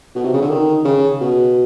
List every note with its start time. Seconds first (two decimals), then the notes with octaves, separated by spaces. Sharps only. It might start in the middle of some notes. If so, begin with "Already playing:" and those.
0.15 B2
0.24 C3
0.33 C#3
0.42 D3
0.49 D#3
0.85 C#3
1.21 B2